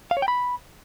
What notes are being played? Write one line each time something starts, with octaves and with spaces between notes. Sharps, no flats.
F5
C#5
G5
B5